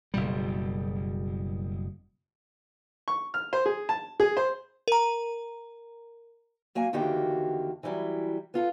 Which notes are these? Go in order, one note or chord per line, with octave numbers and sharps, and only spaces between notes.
F#1 B2 G3
C#6
F6
C5
G#4
A5
G#4
C5
A#4 A#5
F#3 A#3 G#5
E2 D3 D#3 A#3 F#4 G4
E3 F#3 G3 E4
B3 F4 A4